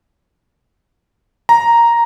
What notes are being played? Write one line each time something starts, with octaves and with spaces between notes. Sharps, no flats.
A#5